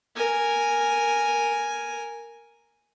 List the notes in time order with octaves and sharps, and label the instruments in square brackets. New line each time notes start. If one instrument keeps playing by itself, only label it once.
[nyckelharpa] A#4 G#5